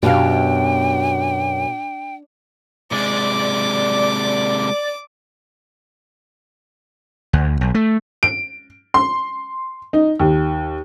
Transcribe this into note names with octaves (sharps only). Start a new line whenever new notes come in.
F#2 B2 D4 G4 F5 G5
C3 G#3 D5 D6
D2
B1
A3
D7
C6
D#4
D#2